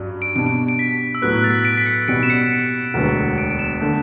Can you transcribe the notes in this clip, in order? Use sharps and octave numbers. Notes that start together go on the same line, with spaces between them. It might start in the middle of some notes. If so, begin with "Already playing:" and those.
Already playing: G2 F#3 C#4 F#4
D7
B2 G3 D4 D7
D7
D7
B6
E6
A2 F#3 B3 F#6
F#6
A6
B6
D7
B6
C#7
B2 G3 C#4 F#4 D7
E7
C#7
D7
E1 D2 D3 F#3 B3
D7
D7
E7
D3 A3